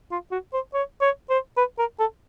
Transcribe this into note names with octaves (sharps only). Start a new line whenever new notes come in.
F4
F#4
C5
C#5
C#5
C5
B4
A#4
A4